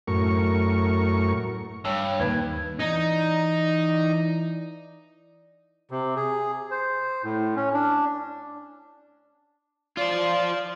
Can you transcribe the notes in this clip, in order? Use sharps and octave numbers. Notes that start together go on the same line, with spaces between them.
F#2 A2 A#4 C#6
G2 C#5 E6
D#2 B4 G#6
E3 D#4 D5
C3
G#4
C5
A2
C#4
D4
F4 C5 D5